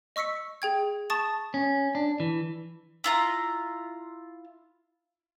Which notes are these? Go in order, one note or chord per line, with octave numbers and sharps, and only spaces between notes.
D#5 C#6 E6 B6 C#7
G#4 G5 G#6
A5 C#6 D#6 A6 E7
C#4
D4
E3
E4 F4 A#5